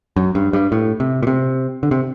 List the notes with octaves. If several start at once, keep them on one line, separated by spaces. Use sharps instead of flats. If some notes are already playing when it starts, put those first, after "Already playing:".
F#2
G2
G2
A2
C3
A#2
C3
D3
C3